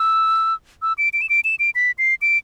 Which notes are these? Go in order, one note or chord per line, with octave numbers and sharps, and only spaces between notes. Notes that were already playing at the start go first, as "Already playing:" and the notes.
Already playing: E6
E6
D7
D7
E7
D7
E7
D7
B6
C7
D7